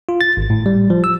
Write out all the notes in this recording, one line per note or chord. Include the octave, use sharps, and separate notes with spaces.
F4
A6
G#1
A2
G3
F3
E6